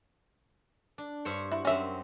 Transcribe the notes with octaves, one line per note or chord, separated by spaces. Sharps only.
D4
G2 C5 C#5
E4 F#4
F#2 C4 C#4 E5 A#5